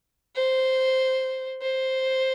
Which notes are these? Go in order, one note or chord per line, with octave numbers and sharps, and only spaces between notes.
C5
C5